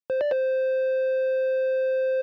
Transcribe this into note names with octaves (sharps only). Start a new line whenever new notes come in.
C5
D5
C5